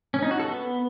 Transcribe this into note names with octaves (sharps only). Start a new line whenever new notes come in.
C#4
D#4
F#4
A4
B3